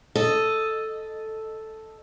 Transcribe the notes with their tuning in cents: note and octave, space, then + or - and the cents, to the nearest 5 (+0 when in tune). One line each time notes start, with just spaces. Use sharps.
A4 +0 D#5 +0